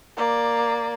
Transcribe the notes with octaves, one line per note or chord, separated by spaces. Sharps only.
A#3 D5